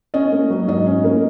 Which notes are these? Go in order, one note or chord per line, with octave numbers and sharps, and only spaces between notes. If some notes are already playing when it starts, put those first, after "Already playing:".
C#4 D#5
A#3
F#3
G#2 D#5
C#4
A#3